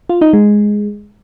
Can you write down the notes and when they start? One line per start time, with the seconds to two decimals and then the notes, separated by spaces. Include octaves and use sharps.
0.09 F4
0.21 D#4
0.33 G#3